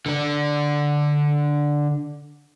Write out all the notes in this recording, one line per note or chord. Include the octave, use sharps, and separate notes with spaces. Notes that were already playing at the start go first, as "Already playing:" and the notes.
D3 D4